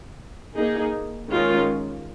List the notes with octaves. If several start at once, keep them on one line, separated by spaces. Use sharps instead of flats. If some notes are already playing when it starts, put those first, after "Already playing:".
A#3 D#4 G#4
D#3 G#3 C#4 F4